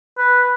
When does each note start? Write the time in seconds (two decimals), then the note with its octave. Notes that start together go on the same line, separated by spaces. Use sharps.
0.18 B4